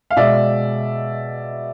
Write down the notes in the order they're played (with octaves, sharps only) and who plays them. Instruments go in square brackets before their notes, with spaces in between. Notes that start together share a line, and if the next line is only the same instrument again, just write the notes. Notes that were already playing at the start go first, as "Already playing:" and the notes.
[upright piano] F5
B2 G#3 D5 E5